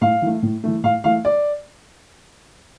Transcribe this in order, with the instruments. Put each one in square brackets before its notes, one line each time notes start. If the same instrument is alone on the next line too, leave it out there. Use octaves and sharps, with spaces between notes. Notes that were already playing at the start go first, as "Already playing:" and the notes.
[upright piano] A2 F5
E3 A3
A2
E3 A3
A2 F5
E3 A3 F5
D5